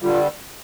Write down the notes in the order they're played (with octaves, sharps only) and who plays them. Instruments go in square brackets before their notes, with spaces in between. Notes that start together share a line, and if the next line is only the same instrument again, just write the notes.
[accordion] G2 D3 G3 [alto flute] F4